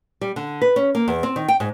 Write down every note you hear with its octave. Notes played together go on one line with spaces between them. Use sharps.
G3
D3
B4
C#4
A#3
E2
C4
D#3
G5
G#2